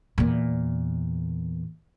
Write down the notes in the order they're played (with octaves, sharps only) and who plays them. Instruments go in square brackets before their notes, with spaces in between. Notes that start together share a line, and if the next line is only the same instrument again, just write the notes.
[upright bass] E2 A#2